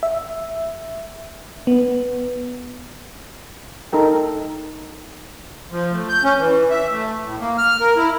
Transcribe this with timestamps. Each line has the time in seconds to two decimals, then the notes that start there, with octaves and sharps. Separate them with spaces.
0.03 E5
1.67 B3
3.93 D#4 A4 A#4 G5
5.71 F3
5.92 A3
6.09 G6
6.23 C#4
6.38 E3
6.70 E5
6.91 A3
7.24 A2
7.40 A#3
7.58 F6
7.80 A#4
7.97 E4